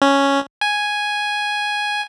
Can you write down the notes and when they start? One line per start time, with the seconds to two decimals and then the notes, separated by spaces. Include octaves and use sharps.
0.02 C#4
0.61 G#5